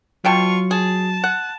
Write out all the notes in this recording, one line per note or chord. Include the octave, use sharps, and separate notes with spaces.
B2 F#3 F4 G5 A5 C#6
G#4 A5
F#5